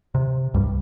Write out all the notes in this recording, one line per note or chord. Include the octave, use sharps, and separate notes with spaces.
C3
C2 G2 G3